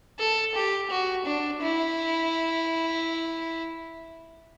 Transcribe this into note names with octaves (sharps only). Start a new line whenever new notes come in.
A4
G4
F#4
D4
E4